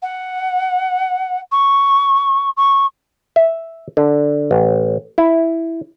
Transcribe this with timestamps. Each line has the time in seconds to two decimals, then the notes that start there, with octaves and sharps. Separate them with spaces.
0.02 F#5
1.51 C#6
2.57 C#6
3.36 E5
3.97 D3
4.51 A1
5.18 E4